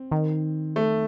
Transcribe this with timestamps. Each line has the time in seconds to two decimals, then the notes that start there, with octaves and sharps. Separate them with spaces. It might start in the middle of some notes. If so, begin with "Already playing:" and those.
Already playing: C4
0.11 D#3
0.76 A3